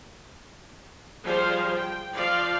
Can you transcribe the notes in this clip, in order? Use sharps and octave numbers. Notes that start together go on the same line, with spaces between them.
F3 G3 G#4 C5 F5
G5
F3 D5 F5